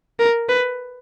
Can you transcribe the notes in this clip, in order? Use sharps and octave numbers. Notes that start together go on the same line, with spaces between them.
A#4
B4